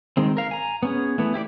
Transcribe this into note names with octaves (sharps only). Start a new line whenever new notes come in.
D#3 G#3 C4
A#4 F5
G#5 A#5
B3 C#4 G#4
E3 A3 B3
E4 G4 C5 D5